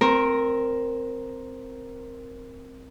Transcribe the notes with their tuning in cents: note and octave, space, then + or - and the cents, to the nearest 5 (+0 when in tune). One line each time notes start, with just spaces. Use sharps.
C4 +0 A#4 +0 C6 +45